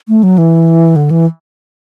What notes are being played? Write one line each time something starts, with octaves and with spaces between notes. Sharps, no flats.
A3
F#3
E3
D3
E3